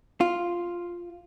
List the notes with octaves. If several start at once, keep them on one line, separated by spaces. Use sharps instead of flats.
F4